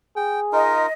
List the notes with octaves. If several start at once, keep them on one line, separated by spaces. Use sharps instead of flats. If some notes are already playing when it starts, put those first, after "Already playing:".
G#4 G5
D#4 F4 A#4 D#5